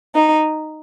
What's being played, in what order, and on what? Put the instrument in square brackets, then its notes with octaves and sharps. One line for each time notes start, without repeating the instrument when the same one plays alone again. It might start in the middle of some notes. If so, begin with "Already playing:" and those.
[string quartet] D#4